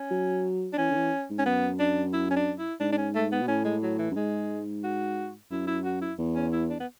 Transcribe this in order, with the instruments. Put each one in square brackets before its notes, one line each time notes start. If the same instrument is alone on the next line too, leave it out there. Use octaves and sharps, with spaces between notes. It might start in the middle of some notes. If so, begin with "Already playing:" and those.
Already playing: [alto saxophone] C#4
[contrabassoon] F#3
[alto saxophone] D4
[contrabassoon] E3 [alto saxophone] C#4
[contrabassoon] D3
E3
G#2
[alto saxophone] C#4
[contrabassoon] F#2 [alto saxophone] B3
[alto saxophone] D4
E4
C#4
D4
E4
[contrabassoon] G#2 [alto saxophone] D4
[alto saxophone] D4
C#4
A3
B3
[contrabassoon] B2
[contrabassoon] A2 [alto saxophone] C#4
[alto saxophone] G#3
F#3
E3
[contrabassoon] F#2
[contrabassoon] G#2 [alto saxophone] G#3
[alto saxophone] F#4
[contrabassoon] F#2 [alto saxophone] E4
[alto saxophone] E4
F#4
E4
[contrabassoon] E2
[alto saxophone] C#4
E4
D4
B3